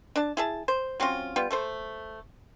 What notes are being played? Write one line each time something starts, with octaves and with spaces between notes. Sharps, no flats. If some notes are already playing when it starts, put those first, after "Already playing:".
D4 A5
E4 G#4 A5
C5
F#3 C4 C#4 F4
G3 B3 F4
A3 A4 C5